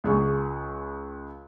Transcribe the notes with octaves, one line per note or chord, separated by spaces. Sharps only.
C#2 G#4 C#6